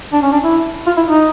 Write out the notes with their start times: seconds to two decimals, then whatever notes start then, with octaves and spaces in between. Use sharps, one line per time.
0.13 D4
0.22 C#4
0.33 D4
0.44 E4
0.86 F4
0.97 E4
1.08 D#4